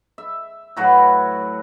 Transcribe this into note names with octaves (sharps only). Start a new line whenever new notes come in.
E5
A2 F#3 F#4 B4